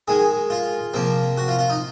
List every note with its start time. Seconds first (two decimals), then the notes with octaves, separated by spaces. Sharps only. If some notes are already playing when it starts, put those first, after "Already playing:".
0.08 D#3 G#3 G#4
0.50 F4
0.94 C3 F3 A#3
1.37 F#4
1.48 F4
1.59 F4
1.70 D#4